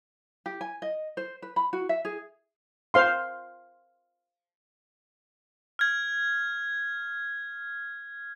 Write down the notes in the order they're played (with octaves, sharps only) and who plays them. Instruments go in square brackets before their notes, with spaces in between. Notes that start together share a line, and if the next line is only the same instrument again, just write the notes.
[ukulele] G4
G#5
D#5
C5
B4
B5
F#4
E5
G#4
[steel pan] C5 F5 C6
[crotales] F6 G#6